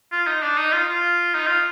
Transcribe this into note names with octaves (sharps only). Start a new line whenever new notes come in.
F4
D#4
D4
D#4
F4
F4
D#4
F4